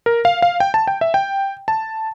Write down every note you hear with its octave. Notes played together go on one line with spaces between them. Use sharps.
A#4
F5
F5
G5
A5
G5
E5
G5
A5